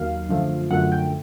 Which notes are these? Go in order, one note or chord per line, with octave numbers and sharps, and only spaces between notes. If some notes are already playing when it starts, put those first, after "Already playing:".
Already playing: D#2 D#3 F#3 A#3 F5
F#2 D3 F3 A3
F#2 D3 F3 A3 F#5
G5